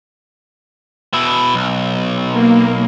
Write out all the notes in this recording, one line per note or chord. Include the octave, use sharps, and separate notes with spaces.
B2 E4
B1
A#3